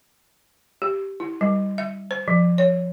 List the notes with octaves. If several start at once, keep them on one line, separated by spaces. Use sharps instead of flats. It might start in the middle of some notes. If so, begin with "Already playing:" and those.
G4
E4
G3
E5
C5
F3
C#5